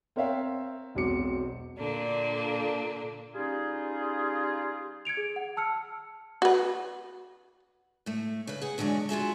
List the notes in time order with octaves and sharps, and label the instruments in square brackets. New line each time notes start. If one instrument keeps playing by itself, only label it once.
[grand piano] C4 A#4 C#5 E5 F5 G5
E1 B1 C4 F#4 D6 C#7
[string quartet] A#2 D3 A#3 D4
[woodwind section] G3 C#4 D#4 F4 G#4
[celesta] G#6 C#7 D7 F7
G#4
F#5
A5 E6 F6 C#7
[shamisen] F#4 B4
[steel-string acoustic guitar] A2 A3
C#3 B4
G#4 F#5
E2 D3 F#3 G#3 C#5
F4 F#4 G#4 E5